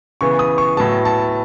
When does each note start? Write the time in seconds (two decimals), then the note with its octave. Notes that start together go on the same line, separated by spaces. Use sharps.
0.21 C#3 E3 B3 C#6
0.39 D#6
0.58 C#6
0.77 A2 F#3 B3 A5
1.05 A5